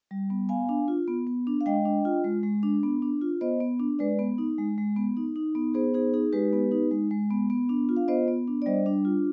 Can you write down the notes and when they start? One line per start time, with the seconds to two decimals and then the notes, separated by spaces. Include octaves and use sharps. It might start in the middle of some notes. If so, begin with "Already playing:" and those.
0.11 G3
0.30 B3
0.49 B3 F5 G#5
0.69 D4
0.88 F4
1.08 B3
1.27 B3
1.47 D4
1.61 F5
1.66 G#3 D#5 G5
1.86 D4
2.05 F4
2.24 G#3
2.43 G#3
2.63 D4
2.83 B3
3.02 D4
3.22 F4
3.41 B3 C5 D#5
3.60 B3
3.80 D4
3.99 G#3 B4 D5
4.19 B3
4.38 D#4
4.58 G#3
4.78 G#3
4.96 B3
5.17 D#4
5.36 D#4
5.55 B3
5.74 B3 G#4 C5
5.94 D#4 G#4 C5
6.14 D#4 G#4
6.32 G#3 G4 B4
6.53 B3
6.72 D#4
6.91 G#3
7.11 G#3
7.30 B3
7.50 B3
7.69 D4
7.89 F4
7.97 F5
8.08 B3 C5 D#5
8.28 B3
8.48 D4
8.62 D5
8.66 G3 C5 D#5
8.86 D4
9.05 F4